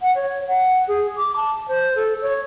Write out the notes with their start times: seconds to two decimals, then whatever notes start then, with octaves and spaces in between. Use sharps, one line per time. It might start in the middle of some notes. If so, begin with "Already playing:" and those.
0.01 F#5
0.15 C#5
0.48 F#5
0.88 G#4
1.17 D6
1.36 A5
1.68 C5
1.95 A4
2.22 C#5